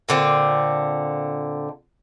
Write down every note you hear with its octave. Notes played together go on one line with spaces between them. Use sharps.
A#2 D3 C4